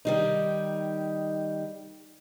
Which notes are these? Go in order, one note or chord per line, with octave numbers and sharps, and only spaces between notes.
D#3 G3 D#4